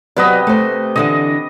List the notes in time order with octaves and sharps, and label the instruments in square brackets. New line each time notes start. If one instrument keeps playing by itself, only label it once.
[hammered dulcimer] C3 B4 D#5 [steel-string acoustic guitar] F#3 B3 D5
[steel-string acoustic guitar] A3 C5
[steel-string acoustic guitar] D3 E3 D4 [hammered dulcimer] D#5